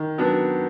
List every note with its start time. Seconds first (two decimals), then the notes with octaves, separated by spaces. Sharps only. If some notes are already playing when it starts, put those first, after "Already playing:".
Already playing: D#3
0.18 F#3 B3 D4